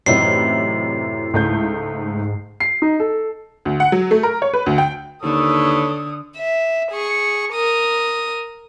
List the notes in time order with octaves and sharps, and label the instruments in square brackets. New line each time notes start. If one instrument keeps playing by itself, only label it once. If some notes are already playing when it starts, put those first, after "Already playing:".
[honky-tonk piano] F#2 C3 E4 [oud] A2 E3 D#4 [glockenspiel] C7
[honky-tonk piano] C#2 A3 G6 [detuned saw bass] G#2
[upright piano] C7
D#4
A4
[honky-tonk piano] D2
F#5
F#3
A3
A#4
C#5
B4
D2
G5
[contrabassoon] D#2 [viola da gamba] D3 [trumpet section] A4 B4 C#5 [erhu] D#6
[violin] E5
G#4 C#6
A#4 D#6